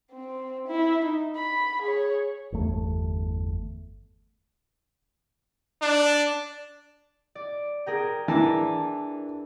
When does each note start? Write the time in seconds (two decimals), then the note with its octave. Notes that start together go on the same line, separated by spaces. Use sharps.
0.12 C4
0.68 E4
1.05 D#4
1.36 B5
1.82 G#4 C#5
2.52 G1 E2 A3
5.82 D4
7.35 D5
7.86 G#4 A#4 G5
8.28 E3 D4 A#4 A5